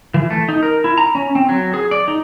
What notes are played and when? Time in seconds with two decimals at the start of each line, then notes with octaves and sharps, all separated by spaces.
0.14 E3
0.30 A3
0.49 D#4
0.63 A#4
0.84 E4
0.98 A#5
1.15 C#4
1.35 C4
1.49 F#3
1.74 G#4
1.91 D5
2.08 D#4